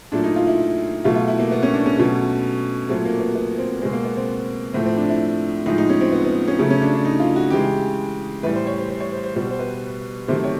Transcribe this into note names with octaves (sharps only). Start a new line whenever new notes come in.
A#2 F#3 A3 D4
D#4
F4
E4
B2 F#3 A3 F4
F4
E4
A#3
B3
C#4
D4
C#4
B2 F#3 A3
A#2 F#3 A3 C4
A#3
B3
B3
C4
B2 G#3 C4
A#3
B3
C4
A2 F3 A3 C4
C4
D4
E4
A2 F3 G#3 D#4
D#4
C#4
C4
B3
B3
C#4
C#3 F#3 A3
C#4
D4
D4
D#4
F4
F#4
C#3 E3 G#3 G4
A2 E3 G3 B4
C5
C#5
C5
C5
C#5
C5
C5
B2 G3 C5
C5
B4
C3 D#3 F#3 A3 C5
C#5